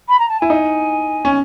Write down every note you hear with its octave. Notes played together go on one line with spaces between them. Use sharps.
B5
A#5
A5
E4 G#5
D#4
C#4